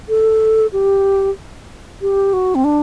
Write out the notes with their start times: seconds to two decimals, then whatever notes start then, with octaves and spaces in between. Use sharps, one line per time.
0.09 A4
0.73 G4
2.01 G4
2.33 F#4
2.55 C4
2.64 D4